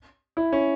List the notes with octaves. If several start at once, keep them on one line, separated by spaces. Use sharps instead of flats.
E4
C#4